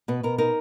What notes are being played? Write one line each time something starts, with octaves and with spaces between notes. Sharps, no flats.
B2 B4
B2 A#4
D#4 A#4